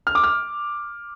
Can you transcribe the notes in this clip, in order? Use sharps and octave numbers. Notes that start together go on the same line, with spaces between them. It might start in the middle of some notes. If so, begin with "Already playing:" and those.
F6
D6
F6